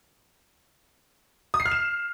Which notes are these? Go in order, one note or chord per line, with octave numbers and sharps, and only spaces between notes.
D#6
C7
F6
E7